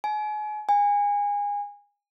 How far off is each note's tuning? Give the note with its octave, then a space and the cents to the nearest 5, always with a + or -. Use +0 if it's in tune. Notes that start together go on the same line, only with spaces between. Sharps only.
G#5 +35
G#5 -25